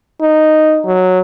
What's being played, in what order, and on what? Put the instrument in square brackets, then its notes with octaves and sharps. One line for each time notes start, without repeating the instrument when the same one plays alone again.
[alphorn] D#4
F#3